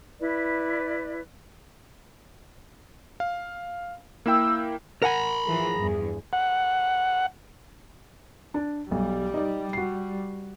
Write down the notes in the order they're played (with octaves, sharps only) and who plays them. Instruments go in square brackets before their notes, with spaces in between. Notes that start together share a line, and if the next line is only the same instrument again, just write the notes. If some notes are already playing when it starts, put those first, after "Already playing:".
[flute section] E4 B4 D5
[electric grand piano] F5
[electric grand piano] A#3 E4 G5 [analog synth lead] E6
[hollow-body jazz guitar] A#4 F#5 G#5 [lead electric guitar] A#5 B5
[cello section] E3 F3 [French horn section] G#4
[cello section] E2 G2
[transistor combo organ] F#5
[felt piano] D4
[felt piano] B1 [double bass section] G3
[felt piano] D#4 D5
F#4 C7